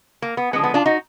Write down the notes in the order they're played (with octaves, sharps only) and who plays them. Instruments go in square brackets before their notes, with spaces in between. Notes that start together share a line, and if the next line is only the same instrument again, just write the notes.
[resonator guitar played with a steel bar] A#3
B3
D3 F3 G#3 B3
B3
D4 F4
D#4 F#4